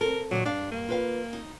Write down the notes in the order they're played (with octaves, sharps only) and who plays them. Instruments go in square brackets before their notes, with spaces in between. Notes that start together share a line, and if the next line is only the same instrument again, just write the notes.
[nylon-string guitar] C4 A4 [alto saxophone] A#4
[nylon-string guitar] A#2 D3 D#3 [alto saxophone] F#3
[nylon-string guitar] G2 F5 [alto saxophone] D4
[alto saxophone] A#3
[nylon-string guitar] F4 B4 F5
D#4